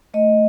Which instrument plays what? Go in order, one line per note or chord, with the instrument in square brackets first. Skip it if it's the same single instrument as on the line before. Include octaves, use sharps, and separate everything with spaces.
[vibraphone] A3 D#5